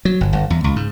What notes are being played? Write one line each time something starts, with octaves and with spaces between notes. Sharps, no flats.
F#3
G1
G1
E2
C#2
G#2